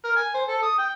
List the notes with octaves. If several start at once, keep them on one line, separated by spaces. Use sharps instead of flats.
A#4
G#5
C5
A4
D#6
G5